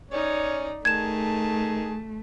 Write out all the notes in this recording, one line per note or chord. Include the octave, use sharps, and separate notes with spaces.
C#4 D#4 C#5 D5
D#3 A3 G#4 A5 G#6 E7